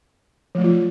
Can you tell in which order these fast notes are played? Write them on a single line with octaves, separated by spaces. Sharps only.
F3 A3 F#3 F4